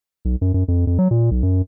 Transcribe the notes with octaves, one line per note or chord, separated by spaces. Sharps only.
B1
F#2
F#2
F2
F2
F#3
A#2
B1
F#2